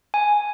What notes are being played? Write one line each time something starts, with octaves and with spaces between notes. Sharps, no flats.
G#5